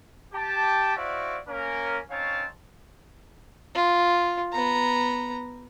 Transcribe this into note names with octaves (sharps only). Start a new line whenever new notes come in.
G4 A5
E4 F#4 C5 D5 E5 F5
A#3 C#4 A#4
C4 C#4 D#4 C#5 F5 A5
F4
B3 A#5